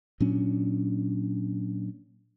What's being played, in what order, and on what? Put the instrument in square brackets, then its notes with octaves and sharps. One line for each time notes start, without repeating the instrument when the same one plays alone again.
[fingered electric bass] A#2 F#3 C#4 D4